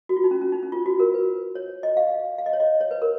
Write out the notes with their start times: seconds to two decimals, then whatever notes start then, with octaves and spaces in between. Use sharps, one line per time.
0.09 F#4
0.17 F4
0.24 D#4
0.31 C#4
0.41 C#4
0.52 D#4
0.63 C#4
0.72 F4
0.86 F#4
1.00 A#4
1.14 B4
1.55 C#5
1.83 D#5
1.97 F5
2.38 F5
2.46 D#5
2.53 C#5
2.60 D#5
2.81 C#5
2.91 B4
3.02 A#4